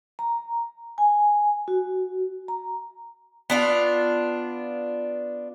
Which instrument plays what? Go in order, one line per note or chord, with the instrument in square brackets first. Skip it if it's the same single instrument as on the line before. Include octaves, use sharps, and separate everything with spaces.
[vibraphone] A#5
G#5
F#4
A#5
[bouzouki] B3 D4 F4